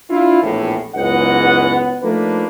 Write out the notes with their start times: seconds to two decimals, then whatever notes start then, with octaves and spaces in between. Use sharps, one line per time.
0.10 D4 E4 F4
0.43 A#1 E2 A2
0.95 F#1 C#2 G#2 B3 D#5 F#5
2.02 F3 A3 A#3 D4 D#4 B4